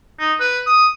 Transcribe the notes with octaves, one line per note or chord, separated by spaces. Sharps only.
D#4
B4
D#6